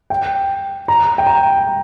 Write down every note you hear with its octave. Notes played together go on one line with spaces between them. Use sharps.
G5
A#5
G5
A#5